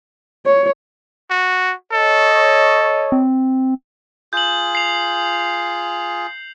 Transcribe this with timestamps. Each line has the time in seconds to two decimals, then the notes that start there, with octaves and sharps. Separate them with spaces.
0.45 C#5
1.30 F#4
1.92 A4 C#5 D#5
3.12 C4
4.33 F4 G#4 G6 F#7
4.75 C7 F7